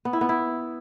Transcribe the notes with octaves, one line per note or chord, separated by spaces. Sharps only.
B3
E4
B3
E4